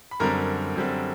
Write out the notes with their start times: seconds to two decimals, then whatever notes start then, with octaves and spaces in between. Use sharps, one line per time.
0.11 B5
0.20 F#2 D3 G3 C4 A#4 A#5
0.76 F#2 D3 G3 C4